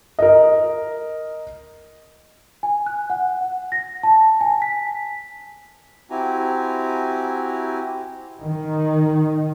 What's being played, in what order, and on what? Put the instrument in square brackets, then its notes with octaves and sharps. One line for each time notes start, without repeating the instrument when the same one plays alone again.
[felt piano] A#4 D#5
[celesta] G#5
F#6
F#5
F#5
A#6
A5
G#5
B6
[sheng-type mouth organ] C4 E4 F#4 G4 G#5 A#5
[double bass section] D#3